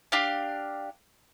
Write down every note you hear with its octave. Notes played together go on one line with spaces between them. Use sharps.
D4 G4 F5